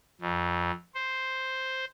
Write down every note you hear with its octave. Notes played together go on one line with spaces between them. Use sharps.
F2
C5